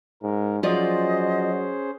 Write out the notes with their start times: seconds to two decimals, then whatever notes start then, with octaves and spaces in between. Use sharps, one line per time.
0.23 G#2 A#4
0.63 F3 F#3 C#4 F4 G#4 C5 D5 D#5